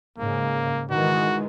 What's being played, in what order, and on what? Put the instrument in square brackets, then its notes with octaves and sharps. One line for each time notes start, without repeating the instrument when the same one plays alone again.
[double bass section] G#2 C#3 [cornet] A#3
[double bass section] D#3 E3 G#3 [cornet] F#4